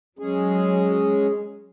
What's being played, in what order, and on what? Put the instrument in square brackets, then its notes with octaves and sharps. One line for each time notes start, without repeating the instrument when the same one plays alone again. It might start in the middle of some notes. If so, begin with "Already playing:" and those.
[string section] F#3 [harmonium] G#3 C#4 G#4